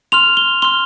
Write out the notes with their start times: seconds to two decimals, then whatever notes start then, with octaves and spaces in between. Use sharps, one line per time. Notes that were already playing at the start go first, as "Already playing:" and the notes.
0.12 C6 F6 F7
0.37 G7
0.62 C6 F6 G7